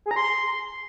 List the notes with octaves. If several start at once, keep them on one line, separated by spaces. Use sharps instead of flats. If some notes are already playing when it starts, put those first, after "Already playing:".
G#4
A#5
C6